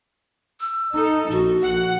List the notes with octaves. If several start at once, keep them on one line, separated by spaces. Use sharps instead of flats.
E6
D#4 A4
A#1 F#4
A#1 F#5